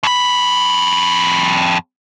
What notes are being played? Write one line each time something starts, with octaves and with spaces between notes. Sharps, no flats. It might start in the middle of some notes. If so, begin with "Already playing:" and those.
F2 B5